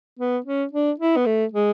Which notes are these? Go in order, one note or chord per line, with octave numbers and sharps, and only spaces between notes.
B3
C#4
D4
E4
B3
A3
G#3